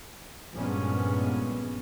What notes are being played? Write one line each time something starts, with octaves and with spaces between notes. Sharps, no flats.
G2 A#2 F3 G#3 B3 C#4